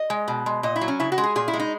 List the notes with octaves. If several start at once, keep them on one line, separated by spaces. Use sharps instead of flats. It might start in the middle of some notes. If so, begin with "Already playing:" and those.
Already playing: D#5
G#3
B2
G#3
A#2 D#5
E4
F#3
C#4
C#3 E4
F#4
G#3
G#4
A#2 G#4
E4
G#3
D#4